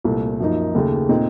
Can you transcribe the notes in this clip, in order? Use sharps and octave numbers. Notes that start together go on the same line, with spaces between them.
C2 A#2 A3
F#2 F3 A#3 D#4
D#2 C#3 A3
A#2 A3 C4 D#4